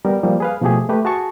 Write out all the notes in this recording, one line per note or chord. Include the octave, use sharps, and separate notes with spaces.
G3 B3 A#4
F3 G3 A#3
G#4 B4 F5
B2 F3 A3 G4 G#4
A3 G4 B4
F#4 G#4 A5 C#6